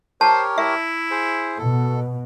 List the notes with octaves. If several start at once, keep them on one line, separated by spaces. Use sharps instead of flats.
G4 A#4 C5 C#5 A5
E4 E5
G#4 C5
B2 A4